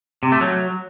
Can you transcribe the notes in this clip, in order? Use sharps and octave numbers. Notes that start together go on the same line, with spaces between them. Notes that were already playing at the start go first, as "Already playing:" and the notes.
C3
A3
F#3